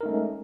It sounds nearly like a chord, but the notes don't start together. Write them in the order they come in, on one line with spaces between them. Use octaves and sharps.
A#4 D#4 A3 C#4 G#3